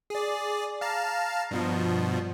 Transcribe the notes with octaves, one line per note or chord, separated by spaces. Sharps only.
G#4 D5
F5 A5 A#5
G2 B2 F3